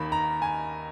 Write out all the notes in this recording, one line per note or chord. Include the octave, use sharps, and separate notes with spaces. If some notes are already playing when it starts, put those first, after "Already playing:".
Already playing: D#2 D#3 A#3 B5
A#5
G#5